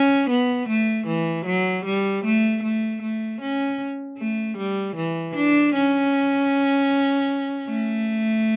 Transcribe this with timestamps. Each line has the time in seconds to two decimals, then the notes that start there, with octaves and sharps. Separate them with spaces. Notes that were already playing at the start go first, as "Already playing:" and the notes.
Already playing: C#4
0.30 B3
0.69 A3
1.07 E3
1.46 F#3
1.85 G3
2.24 A3
2.63 A3
3.02 A3
3.41 C#4
4.18 A3
4.57 G3
4.96 E3
5.36 D4
5.75 C#4
7.69 A3